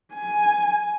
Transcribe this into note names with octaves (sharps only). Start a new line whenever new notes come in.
G#5